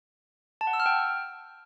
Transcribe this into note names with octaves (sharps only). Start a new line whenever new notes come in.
A5
F#5
E6
F6
G5